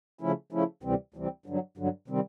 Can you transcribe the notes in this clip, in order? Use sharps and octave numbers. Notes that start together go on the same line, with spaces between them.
C#3 F3 A3 C#4 E4
C#3 F3 A3 C#4 E4
D2 C3 E3 G3 C4
D2 C3 E3 G3 C4
G2 D3 F#3
G2 D3 F#3
C3 D#3 G3 C4